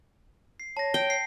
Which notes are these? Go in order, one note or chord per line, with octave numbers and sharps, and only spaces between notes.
C7
C#5 A5 A#6
G5
C7